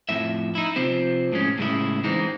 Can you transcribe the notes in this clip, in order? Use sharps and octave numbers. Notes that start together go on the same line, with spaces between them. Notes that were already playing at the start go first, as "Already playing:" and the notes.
F2 A2 E5
D#4 E4
C3 F3 C4
A2 G#3 C#4
A2 C#3 G#3 E4
E3 G#3 C4 D#4